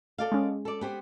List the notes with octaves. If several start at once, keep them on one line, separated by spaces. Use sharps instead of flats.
A4 D5 F5
G#3 C#4
A4 D5
B3 G4 C5